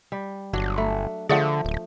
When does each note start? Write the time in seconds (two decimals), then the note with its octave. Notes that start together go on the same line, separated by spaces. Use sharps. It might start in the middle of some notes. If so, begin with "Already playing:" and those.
0.12 G3
0.53 G1 F#3 D4
0.77 A3
1.29 D3 F3 A3 G#4 D5 F#5
1.65 D1